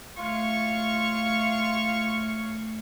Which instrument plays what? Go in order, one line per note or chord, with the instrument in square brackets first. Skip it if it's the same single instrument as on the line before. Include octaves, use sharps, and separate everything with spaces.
[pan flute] A3 [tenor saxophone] F4 [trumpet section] C#5 F5 C#6